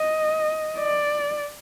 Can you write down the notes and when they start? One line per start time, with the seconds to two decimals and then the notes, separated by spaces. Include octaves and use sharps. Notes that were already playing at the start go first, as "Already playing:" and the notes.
Already playing: D#5
0.78 D5